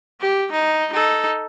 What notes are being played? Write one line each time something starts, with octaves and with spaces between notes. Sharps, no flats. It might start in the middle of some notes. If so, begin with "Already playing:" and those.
G4
D#4
D#4 A4